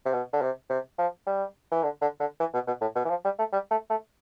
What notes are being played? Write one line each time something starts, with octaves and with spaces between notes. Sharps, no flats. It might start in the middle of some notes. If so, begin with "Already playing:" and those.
C3
B2
D3
C3
C3
F3
G3
E3
D3
D3
D3
E3
B2
B2
A2
B2
E3
F3
G3
A3
G3
A3
A3